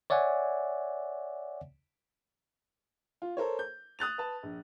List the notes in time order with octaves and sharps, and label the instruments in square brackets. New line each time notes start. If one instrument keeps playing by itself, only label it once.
[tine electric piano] C#5 D5 E5 F#5 G#5
[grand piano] F4
A4 A#4 C5 C#5
G6
D#6 F#6 A6 F7
B4 A5
A#1